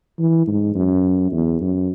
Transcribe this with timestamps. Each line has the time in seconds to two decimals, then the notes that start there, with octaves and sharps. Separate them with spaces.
0.19 E3
0.47 G#2
0.75 F#2
1.32 E2
1.61 F#2